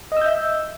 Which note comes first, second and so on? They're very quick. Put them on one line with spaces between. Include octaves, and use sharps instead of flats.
D#5 E6 G6 E5